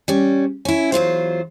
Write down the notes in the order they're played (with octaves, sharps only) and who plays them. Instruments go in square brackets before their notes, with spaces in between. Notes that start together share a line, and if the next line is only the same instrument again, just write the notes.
[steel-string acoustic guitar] G3 C#4
C#4 E4
E2 F#3 F4 C5